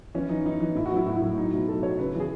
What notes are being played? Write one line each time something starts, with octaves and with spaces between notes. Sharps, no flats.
E3 C#4
E3 D#4
E3 D#4
E3
A2 E4
F#4
F#3
E4
A2 F#4
E4
A2
F#3 D#4
B2 E4
F#3 A4
F#3 C#5
C#3 B4
E3
G#4